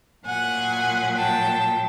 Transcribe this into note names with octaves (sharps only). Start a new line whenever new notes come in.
A#2 F#3 F#5 G#5
G5 A5